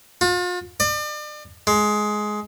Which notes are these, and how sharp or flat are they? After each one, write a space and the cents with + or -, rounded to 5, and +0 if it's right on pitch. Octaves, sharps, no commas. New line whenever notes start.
F4 +40
D5 +40
G#3 +15